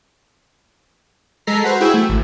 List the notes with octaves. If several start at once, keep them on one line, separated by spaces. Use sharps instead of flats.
G#3 A4 A#5 B6 C7
F#4 B4 C5
E4 F#4 G#4 G5 G#5 E6
A3
G#1